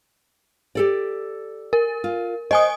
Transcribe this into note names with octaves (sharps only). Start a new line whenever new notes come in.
G4 A4 D5
A#4
F4
C5 D#5 G#5 D#6